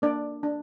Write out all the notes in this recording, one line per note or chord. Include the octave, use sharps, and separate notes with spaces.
A#3 D4 D5
D4